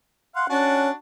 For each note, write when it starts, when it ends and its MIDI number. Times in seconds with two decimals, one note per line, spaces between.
0.36 0.45 77
0.36 0.45 78
0.36 0.49 84
0.49 0.90 61
0.49 0.93 62
0.49 0.93 66
0.49 0.93 81